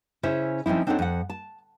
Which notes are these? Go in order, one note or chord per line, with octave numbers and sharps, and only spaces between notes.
C#3 C#4 E4 C5 E5
F3 C4 C#4 D#4 E4
C4 D4 D#4 A4 C#5 F#5
F2 F#5
A5